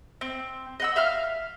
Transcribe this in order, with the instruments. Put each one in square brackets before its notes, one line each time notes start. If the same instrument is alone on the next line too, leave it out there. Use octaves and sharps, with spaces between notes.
[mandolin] C4
D#5 F#5 E6
E5 F5 F6